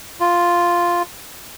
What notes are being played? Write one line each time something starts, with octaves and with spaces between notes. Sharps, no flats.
F4